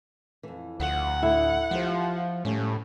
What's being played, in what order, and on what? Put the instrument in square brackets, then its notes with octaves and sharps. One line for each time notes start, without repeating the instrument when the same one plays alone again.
[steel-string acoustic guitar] F2 E3
[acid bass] D2 [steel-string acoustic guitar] F3 F4 [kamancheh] F#5
[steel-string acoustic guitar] A2 D3 [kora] E4
[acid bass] F3 [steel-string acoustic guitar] F4 G4 C5
[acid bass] A2 [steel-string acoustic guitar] G3 A3 C#4